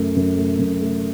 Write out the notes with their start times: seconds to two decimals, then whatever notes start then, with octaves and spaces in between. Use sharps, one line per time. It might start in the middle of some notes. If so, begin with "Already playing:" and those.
Already playing: F#2 A3
0.16 F#2
0.37 A3
0.59 F#2
0.81 A3